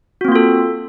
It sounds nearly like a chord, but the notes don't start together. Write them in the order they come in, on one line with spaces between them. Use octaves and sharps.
F#4 C4 A#3 F4 A4